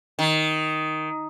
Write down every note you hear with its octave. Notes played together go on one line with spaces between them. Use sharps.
D#3